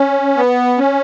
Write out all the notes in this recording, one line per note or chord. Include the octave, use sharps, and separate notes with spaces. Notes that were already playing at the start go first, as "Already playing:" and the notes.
Already playing: C#4
B3
C#4